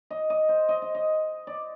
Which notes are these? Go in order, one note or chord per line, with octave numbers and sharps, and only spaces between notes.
D#5
D#5
C5
D#5
D#5
D#5
D5